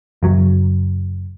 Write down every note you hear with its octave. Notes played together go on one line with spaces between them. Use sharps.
F#1 F#3